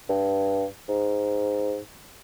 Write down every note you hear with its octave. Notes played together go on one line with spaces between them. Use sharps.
G2
G#2